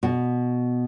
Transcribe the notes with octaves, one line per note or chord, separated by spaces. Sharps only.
B2